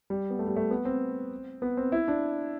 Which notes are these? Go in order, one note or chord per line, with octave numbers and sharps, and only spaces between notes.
G3
B3
A3
G3
A3
B3
C4
B3
C4
E4
D4